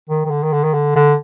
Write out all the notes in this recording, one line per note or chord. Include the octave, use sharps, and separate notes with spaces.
D#3
D#3
D3
D#3
D3
D#3
D3
D3